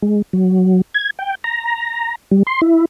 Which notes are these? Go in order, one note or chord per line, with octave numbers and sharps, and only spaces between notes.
G#3
F#3
G#6
G5
A#5
G3
C6
E4